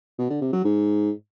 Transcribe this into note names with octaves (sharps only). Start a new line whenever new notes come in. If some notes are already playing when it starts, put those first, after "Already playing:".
B2
D3
C3
F#3
G#2